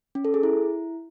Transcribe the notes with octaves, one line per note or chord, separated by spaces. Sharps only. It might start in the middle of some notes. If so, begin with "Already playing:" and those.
C#4
A4
G#4
E4